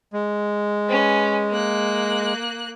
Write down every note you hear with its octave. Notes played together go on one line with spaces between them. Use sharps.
G#3
C#4 B4
A#3 F#6